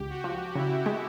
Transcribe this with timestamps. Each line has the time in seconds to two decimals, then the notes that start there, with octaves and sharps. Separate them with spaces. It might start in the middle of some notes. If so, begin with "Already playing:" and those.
Already playing: C#2 G4
0.09 F#4
0.24 F3
0.55 C#3 E4
0.86 G#3